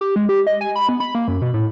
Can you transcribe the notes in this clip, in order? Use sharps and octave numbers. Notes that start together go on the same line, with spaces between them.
G4
G#3
G4
D#5
G#5
B5
B3
B5
A#3
F#2
B2
A2